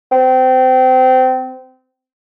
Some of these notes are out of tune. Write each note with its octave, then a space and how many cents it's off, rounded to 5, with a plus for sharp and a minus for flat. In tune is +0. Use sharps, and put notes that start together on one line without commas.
C4 -25